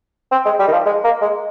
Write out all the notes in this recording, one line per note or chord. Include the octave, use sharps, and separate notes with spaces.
C4
G#3
G3
D#3
F3
G#3
A#3
G#3